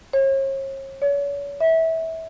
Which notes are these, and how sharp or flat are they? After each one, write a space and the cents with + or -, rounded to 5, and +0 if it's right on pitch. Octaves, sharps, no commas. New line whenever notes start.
C#5 -40
C#5 +40
E5 -20